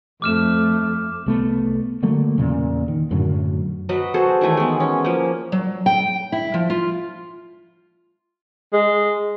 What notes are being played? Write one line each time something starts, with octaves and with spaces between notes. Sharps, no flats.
F2 A3 D6 F6 E7
C2 A3 B3
D3 F#3 A3 A#3
E2 A#2 C#3
D#3
F#2 A2 D3 F#3
F#3 B4 D#5
F#4 G#4 A4 C5
D#3 E3 A3 G#5
G#3 B3
C#4
F3 A#3
F#3
G5
E4
F3
F4
G#3